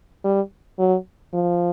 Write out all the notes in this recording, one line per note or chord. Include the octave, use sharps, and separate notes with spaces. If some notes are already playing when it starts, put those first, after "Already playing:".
G3
F#3
F3